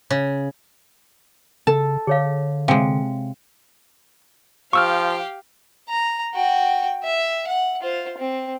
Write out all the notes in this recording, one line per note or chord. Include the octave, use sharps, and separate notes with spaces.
C#3
C#3 A4 A5
D3 G#4 C#5 F5
C3 G#3 F5 G5
F3 G4 F5 C#6 E6 F6
A#5
F#4 G5
E5
F#5
F4 C5
C4